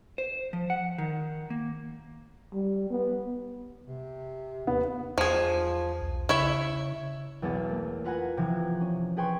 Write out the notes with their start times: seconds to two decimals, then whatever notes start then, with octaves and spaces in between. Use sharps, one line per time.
0.18 C5
0.53 F3
0.70 F#5
0.98 D#3
1.50 A#3
2.53 G3
2.90 B3
3.87 C3
4.67 D#2 B3
5.18 E2 F3 G#4
6.01 B1
6.29 C#3 E4 C#5 E5
7.42 B1 E2 B3 G#4 A6
7.69 A3 A#3
8.04 F4 B4 F#5 G#5 A#5
8.37 C3 E3 F3 G#6
8.81 C#4
9.17 G#4 B4 G5 G#5 C6 C#6